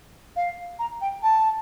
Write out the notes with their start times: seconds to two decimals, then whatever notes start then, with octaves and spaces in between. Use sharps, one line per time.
0.36 F5
0.79 A#5
1.01 G5
1.23 A5